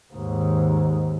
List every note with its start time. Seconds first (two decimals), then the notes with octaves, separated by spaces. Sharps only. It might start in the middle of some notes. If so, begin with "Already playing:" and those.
0.13 D#2 G#2